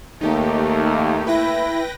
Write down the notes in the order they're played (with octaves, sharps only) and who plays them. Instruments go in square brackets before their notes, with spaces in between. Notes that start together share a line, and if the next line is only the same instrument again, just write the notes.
[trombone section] D#2 [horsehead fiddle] A3 A#3 [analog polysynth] D#4 G4
[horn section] E4 [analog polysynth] B4 G5 A#6